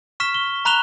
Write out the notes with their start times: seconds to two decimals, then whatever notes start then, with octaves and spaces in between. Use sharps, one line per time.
0.20 C#6 F6 B6 E7
0.34 G7
0.65 A#5 B5 F#6 E7 F7 G7